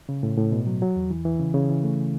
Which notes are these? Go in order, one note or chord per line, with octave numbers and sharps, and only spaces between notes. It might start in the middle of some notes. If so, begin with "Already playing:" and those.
C#3
A2
A2
B2
F#3
F#3
E2
E3
E3
C#3
C#3
E3
A3